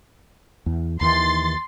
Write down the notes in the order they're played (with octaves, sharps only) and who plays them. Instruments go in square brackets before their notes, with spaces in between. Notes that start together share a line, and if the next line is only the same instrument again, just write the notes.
[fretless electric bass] E2
[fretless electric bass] D#2 D#3 E3 [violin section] C6 A6